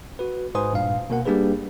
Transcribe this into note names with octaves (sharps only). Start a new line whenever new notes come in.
F#4 B4
G#2 B4 C5 G#5 C6 D#6
G2 A#2 F5
B2 A#3 A#4 F#5
G3 A#3 D4 G4 G#4 B4